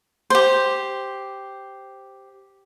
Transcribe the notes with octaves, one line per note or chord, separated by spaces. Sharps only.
G4 C5